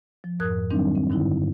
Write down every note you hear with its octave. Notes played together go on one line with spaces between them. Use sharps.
F3
F2 G#2 A#4 D#6 F#6 G#6
D#3 F#3 G3 C4 D4 D#4
C4
G2 D3 D#4 E4